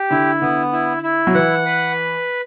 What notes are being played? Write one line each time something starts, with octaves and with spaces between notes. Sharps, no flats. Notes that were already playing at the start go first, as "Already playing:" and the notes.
Already playing: G4
D3 E4
D3 B3
E4
E4
F#3
E3 F#5
B4